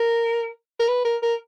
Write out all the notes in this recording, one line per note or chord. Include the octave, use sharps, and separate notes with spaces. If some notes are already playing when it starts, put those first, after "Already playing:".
Already playing: A#4
A#4
B4
A#4
A#4